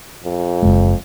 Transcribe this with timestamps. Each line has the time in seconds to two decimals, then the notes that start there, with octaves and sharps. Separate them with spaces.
0.23 F2
0.62 F#1 G#3